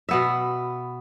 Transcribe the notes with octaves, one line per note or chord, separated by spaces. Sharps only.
B2 B3 E5